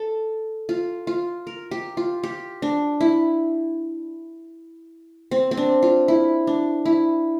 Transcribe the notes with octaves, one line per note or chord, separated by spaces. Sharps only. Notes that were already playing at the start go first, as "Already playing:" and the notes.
Already playing: A4
F4
F4
A#4
G4
F4
G4
D4
E4
C4
C4
D4
F4
E4
D4
E4